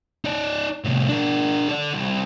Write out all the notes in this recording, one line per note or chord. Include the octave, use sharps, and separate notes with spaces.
D#4 D5
C2 A2
D4 A#4
A4 D5
C2